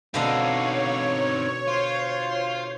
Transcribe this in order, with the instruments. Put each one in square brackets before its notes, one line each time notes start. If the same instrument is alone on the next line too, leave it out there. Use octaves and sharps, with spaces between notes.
[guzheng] B2 D3 D4 [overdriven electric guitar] C4 D#4 [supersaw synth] C#5 [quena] F5
[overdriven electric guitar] F4 [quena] C5